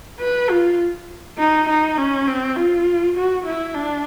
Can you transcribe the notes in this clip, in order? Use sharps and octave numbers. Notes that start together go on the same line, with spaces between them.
B4
F4
D#4
D#4
C#4
C4
F4
F#4
E4
D4